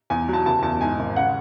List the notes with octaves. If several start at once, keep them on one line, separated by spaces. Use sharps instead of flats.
E2 G#5
F#3 A5
F#1 A5
E2 A5
G#2 G#5
G#1
C#3 F#5